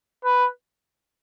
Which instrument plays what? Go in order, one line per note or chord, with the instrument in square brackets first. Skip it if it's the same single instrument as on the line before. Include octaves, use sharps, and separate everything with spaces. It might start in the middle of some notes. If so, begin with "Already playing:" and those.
[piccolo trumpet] B4